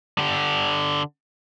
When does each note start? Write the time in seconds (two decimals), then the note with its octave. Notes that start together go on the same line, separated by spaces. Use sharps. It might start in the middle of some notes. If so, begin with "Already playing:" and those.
0.19 D3 G4